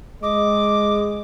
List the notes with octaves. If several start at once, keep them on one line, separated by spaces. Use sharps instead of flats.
G#3 D#5 D6